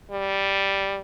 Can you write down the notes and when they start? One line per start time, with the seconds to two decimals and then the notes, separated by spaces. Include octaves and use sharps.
0.11 G3